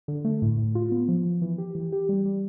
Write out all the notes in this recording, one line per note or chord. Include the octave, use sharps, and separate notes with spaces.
D3
A3
A2
A2
F4
B3
F3
F3
E3
G4
E3
G4
G3
G3